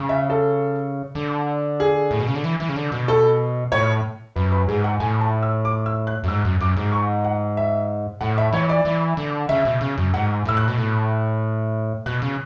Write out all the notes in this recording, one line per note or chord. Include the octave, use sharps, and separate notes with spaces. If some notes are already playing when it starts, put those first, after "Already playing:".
Already playing: C#3
E5
A4
D3
G#4
A2
B2
C#3
D3
E3
E3
C#3
D3
B2
A4
A2 C#5
F#2 B4
B4
G#2 G#4
F#5
A2 G#5
A5
E6
D6
E6
F#6
F#2
G#2 E6
F#2
F#2 D6
G#2
C#6
F#5
E5
A2 F#5
E5
E3 C#5
D5
E3
D3
C#3 E5
B2
C#3
F#2
G#2 F#5
A2 E6
F#6
B2
A2
B2 F#6
C#3